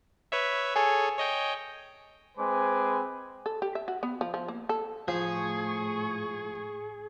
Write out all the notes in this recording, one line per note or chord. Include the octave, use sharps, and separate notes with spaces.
B4 C#5 E5
G#4 A4 C#5 G#5
C#5 D#5 G5
G#3 C4 B4 C5 G#5 D6
A4
G4
E5
F#4
B3
F3
F3
A#3
A4
A2 F3 G#4 C#6